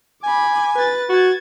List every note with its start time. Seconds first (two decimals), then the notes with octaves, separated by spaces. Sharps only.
0.24 G#5 B5 D6
0.76 B4 A6
1.09 F#4 G#6 A6